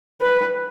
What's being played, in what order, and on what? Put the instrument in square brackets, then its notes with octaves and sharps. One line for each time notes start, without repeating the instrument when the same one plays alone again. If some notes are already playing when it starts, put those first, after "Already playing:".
[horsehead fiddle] B4